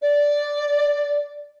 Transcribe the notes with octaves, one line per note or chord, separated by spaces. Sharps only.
D5